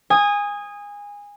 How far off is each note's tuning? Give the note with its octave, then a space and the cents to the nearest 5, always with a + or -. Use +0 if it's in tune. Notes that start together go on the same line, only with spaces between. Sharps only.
G#5 -20 D#6 +0